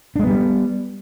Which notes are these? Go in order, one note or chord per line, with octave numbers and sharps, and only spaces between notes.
G3 G#3 B3 D4